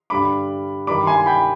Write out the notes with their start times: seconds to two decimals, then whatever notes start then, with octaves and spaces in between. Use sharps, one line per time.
0.10 G2 D3 G3 D4 B5 D6
0.87 G2 D#3 G3 B5 D6
1.07 G#5 C6
1.26 G5 B5